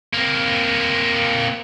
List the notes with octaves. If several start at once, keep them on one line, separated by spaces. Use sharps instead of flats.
A#3 C4